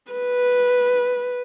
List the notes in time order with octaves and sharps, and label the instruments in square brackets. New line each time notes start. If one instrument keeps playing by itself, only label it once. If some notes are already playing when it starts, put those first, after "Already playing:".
[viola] B4